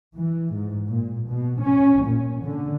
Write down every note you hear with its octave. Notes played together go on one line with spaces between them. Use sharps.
E3
G#2
A#2
B2
C#4
A#2
D3